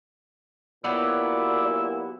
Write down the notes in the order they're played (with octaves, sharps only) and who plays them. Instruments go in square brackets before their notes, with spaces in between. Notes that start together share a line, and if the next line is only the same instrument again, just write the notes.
[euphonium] A#2 [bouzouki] F#3 B3 G4 [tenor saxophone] E4 [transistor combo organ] D5